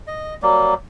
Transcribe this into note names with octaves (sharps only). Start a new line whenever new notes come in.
D#5
F#3 G3 A#3